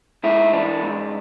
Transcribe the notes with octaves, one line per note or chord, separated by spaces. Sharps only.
G#2 E4
E3 D4
G#2